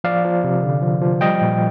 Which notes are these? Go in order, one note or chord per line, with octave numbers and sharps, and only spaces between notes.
F3 D5 F5
F3
C3
D3
F3
F3
G3 D#5 G5
A#2